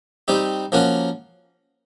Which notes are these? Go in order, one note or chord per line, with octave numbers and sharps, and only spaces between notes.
G3 C4 D#4 G4
F3 A#3 C#4 F#4